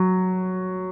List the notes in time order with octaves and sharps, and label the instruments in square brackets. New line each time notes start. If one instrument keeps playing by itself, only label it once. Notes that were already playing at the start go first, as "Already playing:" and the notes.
Already playing: [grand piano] F#3